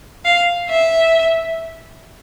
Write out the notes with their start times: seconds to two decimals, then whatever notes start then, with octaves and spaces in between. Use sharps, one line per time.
0.25 F5
0.69 E5